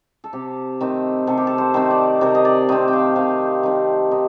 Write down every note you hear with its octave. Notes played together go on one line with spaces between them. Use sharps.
A4
C3 G4
D#3 A3 C4
C3 A4
G4
A4
C5
D#3 A3 C4
D5
C3 A#4
D#5
D5
D#3 A3 C4 D#5
G5
F5
C3 F5
D#3 A3 C4
D#3 D#5